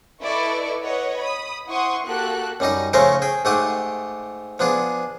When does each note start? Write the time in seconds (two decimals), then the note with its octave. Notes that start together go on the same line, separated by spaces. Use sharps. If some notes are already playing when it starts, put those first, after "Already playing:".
0.22 E4 A4 B4 D5 D#5 C#6
0.82 B4 C#5 D#5 F#5
1.19 B5 D#6
1.67 E4 C5 F#5 C6 C#6 D#6
2.06 A#3 F#4 G4 A4 F#6
2.60 F#2 G3 D#4 D#6
2.93 C#3 F3 A3 C#4 A#4 C5
3.22 G#4 G5
3.45 G#2 A3 G4 F#5 D#6
4.59 F3 B3 D4 G#4